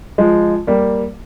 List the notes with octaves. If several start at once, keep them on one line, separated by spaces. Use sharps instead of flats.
F3 G#3
G3 A#3